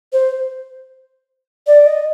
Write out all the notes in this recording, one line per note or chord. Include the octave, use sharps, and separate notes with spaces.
C5
D5
D#5